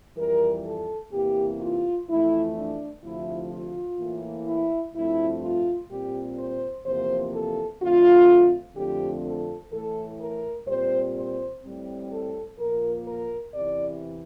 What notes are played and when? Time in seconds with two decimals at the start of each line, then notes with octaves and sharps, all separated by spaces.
0.16 F2 E3 G3 A#4
0.65 A4
1.12 E2 C3 E3 A#3 G4
1.61 F4
2.08 F2 E3 A3 E4
2.56 D4
3.03 D2 C3 F3 A3 E4
3.50 F4
3.98 A2 E3 A#3
4.47 E4
4.94 G2 F3 A3 C4 E4
5.42 F4
5.89 A#2 G3 C4 G4
6.37 C5
6.85 E2 C3 F3 A#3 C5
7.33 A4
7.81 F2 D3 A3 C4 F4
8.76 F2 D3 F3 A3 C4 G4
9.24 A4
9.72 A2 E3 A3 A4
10.20 A#4
10.67 A#2 G3 C4 C5
11.14 C5
11.63 A2 G3 C4
12.11 A4
12.58 A#2 F3 A#3 A#4
13.06 A#4
13.53 E2 C3 E3 D5